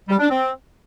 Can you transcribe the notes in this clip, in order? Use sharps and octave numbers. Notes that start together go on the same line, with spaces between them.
G3
D4
C4